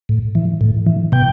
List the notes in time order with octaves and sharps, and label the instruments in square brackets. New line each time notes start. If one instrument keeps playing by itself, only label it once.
[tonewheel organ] A2
E3
A2
E3
B2 G5